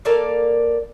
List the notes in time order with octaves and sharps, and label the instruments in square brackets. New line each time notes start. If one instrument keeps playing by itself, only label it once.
[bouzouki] A#3 A4 D5 F5